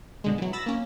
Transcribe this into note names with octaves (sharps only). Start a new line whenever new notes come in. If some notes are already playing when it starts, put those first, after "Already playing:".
B2 D3 G#3
E3 F#3
B5 E6 A6 A#6
A#3 C#4